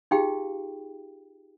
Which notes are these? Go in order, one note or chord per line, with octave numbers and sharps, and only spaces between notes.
D#4 F4 G4 G#4 F5 G5